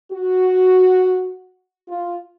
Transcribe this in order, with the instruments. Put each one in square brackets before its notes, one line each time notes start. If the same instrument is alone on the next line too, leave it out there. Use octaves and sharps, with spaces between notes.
[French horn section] F#4
F4